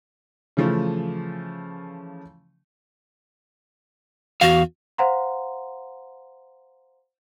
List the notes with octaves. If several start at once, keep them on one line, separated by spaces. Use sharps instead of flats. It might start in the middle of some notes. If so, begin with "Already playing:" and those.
C#3 E3 F3 A3
E2 F#4 F5
C5 F5 F#5 A#5 C6